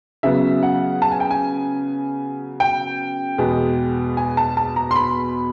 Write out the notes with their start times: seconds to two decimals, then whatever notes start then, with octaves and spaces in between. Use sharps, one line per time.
0.23 C#3 F#3 B3 E5
0.63 F#5
1.02 A5
1.12 G#5
1.20 G5
1.31 G#5
2.60 G5
3.38 E2 B2 G#3 B3
4.17 G#5
4.37 A5
4.57 A5
4.76 A#5
4.91 C6
4.96 B5